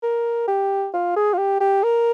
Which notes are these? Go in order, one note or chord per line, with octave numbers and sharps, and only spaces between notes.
A#4
G4
F4
G#4
F4
G4
G4
A#4